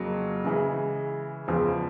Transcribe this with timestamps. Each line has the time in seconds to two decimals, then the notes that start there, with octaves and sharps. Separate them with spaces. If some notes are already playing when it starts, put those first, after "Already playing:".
Already playing: F2 C#3 F#3 A#3
0.44 C#3 E3 G#3
1.48 E2 C#3 F3 G#3